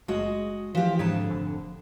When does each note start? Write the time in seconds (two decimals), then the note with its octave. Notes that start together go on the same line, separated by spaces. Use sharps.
0.08 F#1 G#3 F#4 D#5
0.75 E3 F3 G4
0.99 F2 G#2 D3 A5
1.30 F1